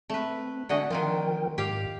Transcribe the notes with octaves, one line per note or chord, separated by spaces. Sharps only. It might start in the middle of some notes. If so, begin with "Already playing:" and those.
A3 C4 B4
D3 F#4 D#5 E5 F#5 G#5
D#3 F3 C4 F4 A#4 G5
G#2 G4 F5